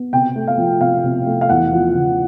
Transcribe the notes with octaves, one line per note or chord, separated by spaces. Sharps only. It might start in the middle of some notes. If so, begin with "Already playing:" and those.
Already playing: B3
C3 G5
A3
F5
F3
C3 F5
C3
A3
F5
E2 F#5
F3
C#3